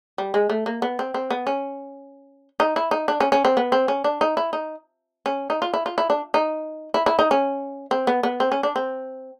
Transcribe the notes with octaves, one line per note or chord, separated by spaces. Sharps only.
G3
G#3
A3
A#3
B3
C4
C4
B3
C#4
D#4
E4
D#4
D4
C#4
C#4
C4
B3
C4
C#4
D4
D#4
E4
D#4
C#4
D#4
F4
E4
F4
E4
D4
D#4
E4
E4
D#4
C#4
C4
B3
B3
C4
C#4
D4
C4